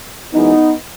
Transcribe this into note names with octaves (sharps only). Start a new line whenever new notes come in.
F#2 E3 G#3 B3 D#4